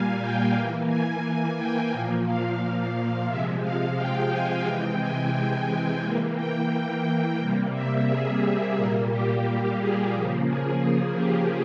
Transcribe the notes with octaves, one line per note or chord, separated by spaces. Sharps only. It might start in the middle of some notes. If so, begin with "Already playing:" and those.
Already playing: A#2 G3 A#3 F5 G#5
G5
E3 A#3
G#5
G5
A#2 F3 A#3
F5
C3 F3 G#3 E5
F5
G5
G#5
C3 E3 G#3 G5
G#5
G5
G5
E3 A#3
G5
C3 G3 A#3
E5
G#4
G#4
A#2 G3 A#3 A#4
G4
G4
G#4
C#3 F3 A#3
G#4
G4